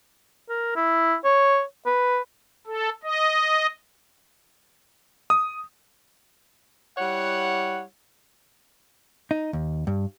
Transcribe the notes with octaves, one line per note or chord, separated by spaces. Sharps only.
A#4
E4
C#5
B4
A4
D#5
D#6
G3 E4 C#5 F#5
D#4
D#2
G2